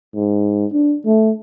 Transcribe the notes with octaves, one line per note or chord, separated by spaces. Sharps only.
G#2
D4
A3